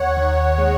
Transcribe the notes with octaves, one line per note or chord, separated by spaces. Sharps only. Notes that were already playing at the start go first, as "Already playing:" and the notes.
Already playing: D#2 C#5 F#5
D#3
G#3